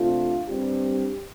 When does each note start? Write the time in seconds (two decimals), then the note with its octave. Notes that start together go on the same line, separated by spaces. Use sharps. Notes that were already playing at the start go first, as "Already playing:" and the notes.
Already playing: C3 A3 D4 F4
0.48 G2 G3 C4 G4